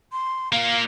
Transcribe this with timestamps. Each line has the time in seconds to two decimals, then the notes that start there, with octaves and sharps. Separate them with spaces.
0.12 C6
0.52 A#2 A#3 F5